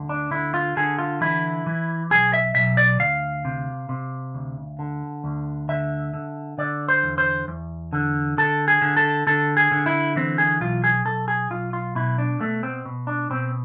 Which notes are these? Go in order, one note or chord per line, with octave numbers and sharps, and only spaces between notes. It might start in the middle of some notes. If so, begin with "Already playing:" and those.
Already playing: D2 D3
D4
D3 E4
F4
D3 G#4
F4
E3 E4
E3
B1 G#4
E5
B1 E5
D5
D2 F5
C3
C3
D2
D3
D2
D3 E5
D3
D3 D5
C5
E2
C5
E2
D3
D3 A4
G#4
D3
A4
D3 A4
G#4
D3
E4
E3 C4
G#4
B1 F4
G#4
B1 A4
G#4
B1 F4
F4
B2 E4
D4
B2 A3
C4
B2
D4
B2 C4